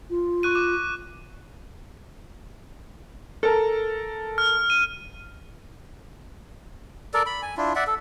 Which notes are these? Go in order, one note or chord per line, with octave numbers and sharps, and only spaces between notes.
F4
C#6 F#6 D#7
D6
A4 A#4
F6
D#7
A4 A#4 D5
B5
G#5
D4 E4 F4
D5 E5 F#5
A4